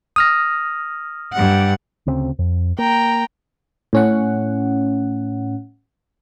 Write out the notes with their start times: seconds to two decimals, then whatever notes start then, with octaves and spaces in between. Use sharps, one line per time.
0.16 D#6 F6 A#6
1.33 G2 F#5
2.07 D2 C#3 C4
2.39 F2
2.79 A#3 G5 A#5
3.93 A2 C#4 F#5